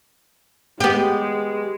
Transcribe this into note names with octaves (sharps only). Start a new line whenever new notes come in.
G#3 B3 G4